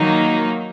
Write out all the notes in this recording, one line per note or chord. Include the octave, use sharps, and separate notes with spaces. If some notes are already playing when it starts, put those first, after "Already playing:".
Already playing: D#3 F#3 A#3 D#4